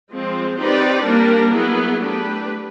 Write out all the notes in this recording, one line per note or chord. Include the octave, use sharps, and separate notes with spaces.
F3 G#3 C4
C4 D#4 G4 B4 D5
G3 A#3 D4 G4 A#4
F#3 B3 E4 G#4
A3 D4 G4 B4